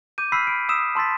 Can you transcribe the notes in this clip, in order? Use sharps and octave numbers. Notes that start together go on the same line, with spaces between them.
D6 G6 D#7
B5 E6 F6 B6 C7
D7
D#6 E6 B6 E7
A5 C6 E6 A6 B6